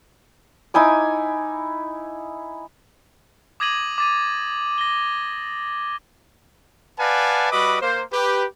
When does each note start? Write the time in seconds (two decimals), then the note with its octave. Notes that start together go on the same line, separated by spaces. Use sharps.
0.74 D#4 E4 G#5 D6
3.60 D6 D#6 G#6 A#6 D#7 F#7
3.98 D6 A6 D#7
4.78 A#6 G7
6.99 B4 D5 F5 F#5 G#5 A5
7.52 G3 F#4 B4 D#5 B5 D6
7.81 A#3 C5
8.12 G4 B4